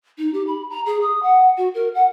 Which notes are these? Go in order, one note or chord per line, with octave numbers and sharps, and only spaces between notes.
D#4
G4
B5
A#5
G#4
D#6
F#5
F#4
A#4
F#5